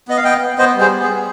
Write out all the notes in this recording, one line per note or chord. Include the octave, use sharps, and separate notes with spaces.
B3 D#5
F5
B3 D#5 G5
B3
B3 C5 D#5
G3
G#4 C5
B3
G#4
G3